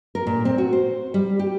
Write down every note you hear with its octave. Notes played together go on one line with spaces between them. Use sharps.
A#4
A#2
C4
F#4
C5
G3
G4